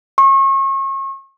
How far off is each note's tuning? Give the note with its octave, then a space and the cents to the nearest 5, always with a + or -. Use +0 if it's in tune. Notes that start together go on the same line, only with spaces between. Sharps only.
C#6 -35